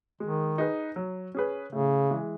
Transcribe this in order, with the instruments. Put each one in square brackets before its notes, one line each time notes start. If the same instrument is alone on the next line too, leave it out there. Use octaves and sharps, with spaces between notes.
[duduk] D#3 [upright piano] G#3
[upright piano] D#4 G#4 B4
F#3
C#4 G#4 B4
[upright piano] A2 [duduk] C#3
[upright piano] E3 G#3